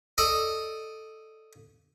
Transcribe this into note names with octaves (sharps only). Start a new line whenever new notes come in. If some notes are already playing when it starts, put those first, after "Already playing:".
A4 D5 D#5